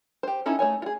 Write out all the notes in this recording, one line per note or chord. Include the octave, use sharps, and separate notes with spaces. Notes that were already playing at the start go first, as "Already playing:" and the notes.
G4 C5
C#4 D#4 E4 A4
A3 D#4 C#5 G#5
F4 G#4